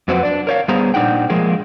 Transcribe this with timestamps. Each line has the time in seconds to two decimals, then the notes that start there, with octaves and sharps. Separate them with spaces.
0.08 F2 F#3 C4 F#4 B4
0.23 D4 D5
0.47 A#4 C#5 F5
0.68 G3 B3 G#4 C5 A#5
0.94 A#2 D4 D#4 F#5 G5
1.30 F3 G#3 A#3 G#4